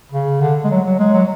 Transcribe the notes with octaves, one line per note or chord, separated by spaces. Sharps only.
C#3
D3
G#3
F#3
F#3
G#3
F#3